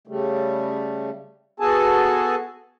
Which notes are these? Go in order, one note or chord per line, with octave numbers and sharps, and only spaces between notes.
C#3 G3 A3
B3 F#4 G#4 A4 G#5 A5